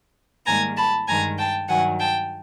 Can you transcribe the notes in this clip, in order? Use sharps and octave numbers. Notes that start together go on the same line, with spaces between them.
G#2 D#3 G3 A#3 G#5 A#5
A5 B5
G2 D#3 G#3 G#5 A#5
G5 A5
G2 D#3 F#3 F#5 G#5
G5 A5